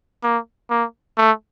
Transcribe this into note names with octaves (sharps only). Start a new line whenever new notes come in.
A#3
A#3
A3